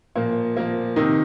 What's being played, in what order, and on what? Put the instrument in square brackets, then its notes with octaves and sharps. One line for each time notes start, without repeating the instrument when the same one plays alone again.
[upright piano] A#2 F3 A#3
A#2 F3 A#3
C3 D#3 D#4